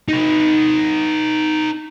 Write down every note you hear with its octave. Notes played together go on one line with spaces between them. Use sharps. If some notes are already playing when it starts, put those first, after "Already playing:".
D#4 B4